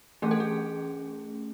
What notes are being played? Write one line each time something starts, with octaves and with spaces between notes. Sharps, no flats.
E3 A3 C#4 G#4
A4
G#4